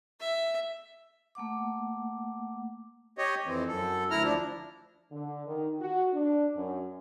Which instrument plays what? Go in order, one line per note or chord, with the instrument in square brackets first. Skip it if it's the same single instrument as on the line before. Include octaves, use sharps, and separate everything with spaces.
[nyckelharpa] E5
[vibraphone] A3 A#3 F#5 D6
[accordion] G4 C#5 D#5
F2 E3 C4
F#2 A4
D2 E4 A#5 F6
F3 D4
[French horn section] D3
D#3
F#4
D4
F#2